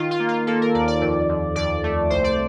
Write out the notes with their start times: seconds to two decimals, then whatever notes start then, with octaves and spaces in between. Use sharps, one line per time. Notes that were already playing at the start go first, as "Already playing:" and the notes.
Already playing: D#3 F4
0.11 F4
0.20 A#3
0.28 F4
0.47 A#3 A4
0.61 A#4
0.74 D#2 D5
0.88 D5
1.01 F2
1.29 F2
1.56 F2 D5
1.84 A3
2.10 C2 C5
2.24 D5